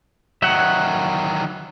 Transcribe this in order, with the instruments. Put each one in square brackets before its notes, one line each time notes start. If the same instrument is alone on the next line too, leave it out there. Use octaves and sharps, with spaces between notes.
[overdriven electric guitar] D#3 F#3 [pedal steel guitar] E5 F#5